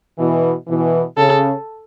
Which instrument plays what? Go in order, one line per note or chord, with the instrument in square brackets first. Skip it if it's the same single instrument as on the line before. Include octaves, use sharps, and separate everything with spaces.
[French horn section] B2 E3
B2 E3
[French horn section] C#3 [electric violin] A4